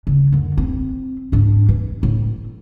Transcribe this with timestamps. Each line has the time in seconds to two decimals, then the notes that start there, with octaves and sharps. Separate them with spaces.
0.07 C#3
0.32 F#2 D3
0.57 C4
1.32 G#2 D4
1.69 E3
2.03 A2